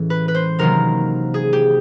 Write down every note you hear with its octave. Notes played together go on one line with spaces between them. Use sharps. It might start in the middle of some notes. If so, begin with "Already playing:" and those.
Already playing: A2 E3 G#3 C#4
B4
B4
C5
C3 D#3 F#3 A#3 A#4
G#4
G4